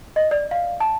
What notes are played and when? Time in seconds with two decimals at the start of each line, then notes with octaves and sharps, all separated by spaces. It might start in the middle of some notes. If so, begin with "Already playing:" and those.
0.16 D#5
0.31 D5
0.51 F5
0.80 A5